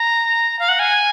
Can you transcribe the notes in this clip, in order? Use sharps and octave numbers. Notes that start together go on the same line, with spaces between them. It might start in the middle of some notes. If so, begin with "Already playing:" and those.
Already playing: A#5
F5
F#5
G#5